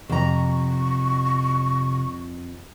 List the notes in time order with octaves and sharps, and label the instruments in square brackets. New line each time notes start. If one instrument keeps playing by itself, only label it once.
[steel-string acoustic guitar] F2 A#5 [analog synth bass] C3 [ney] C#6